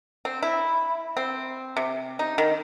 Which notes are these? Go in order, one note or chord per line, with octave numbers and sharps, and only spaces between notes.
C4
E4
C4
C3
D#4
D#3